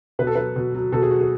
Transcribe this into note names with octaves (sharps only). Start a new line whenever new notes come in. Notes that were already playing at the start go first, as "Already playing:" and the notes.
B2 B4
A4
F#3 B4
B2
F#3
B2 A4
G#4
F#3 F#4
G#4